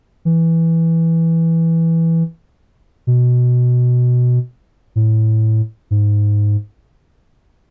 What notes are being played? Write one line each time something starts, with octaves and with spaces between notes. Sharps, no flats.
E3
B2
A2
G#2